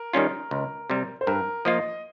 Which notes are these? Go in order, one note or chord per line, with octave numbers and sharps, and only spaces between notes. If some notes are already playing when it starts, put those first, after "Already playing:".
Already playing: A#4
D#3 G3 C#4 F4
C#2
C3 G3
C5
G2 A#4
F3 A#3 F4 D#5